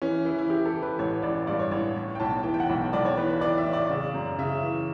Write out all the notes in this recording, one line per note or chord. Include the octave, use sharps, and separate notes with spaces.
E3 C#4
E3 E4
E4
E3 G4
A4
E3
B4
A1 C#5
A1 D5
G2 D5
C#5
A1 C#5
A2
G5
B1 A5
E3 G5
G5
F#5
B1
B1 D5
C#5
E3 B4
B4
E3 D5
E5
A2
D5
C#3 D5
F#2
C#3 E5
E3